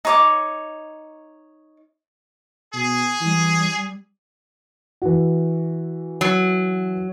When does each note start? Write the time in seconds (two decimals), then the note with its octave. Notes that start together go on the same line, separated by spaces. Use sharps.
0.05 D#4 C#5 D6
2.74 B2 G#4
3.21 E3 G3
5.02 E3 F#4
6.21 F#3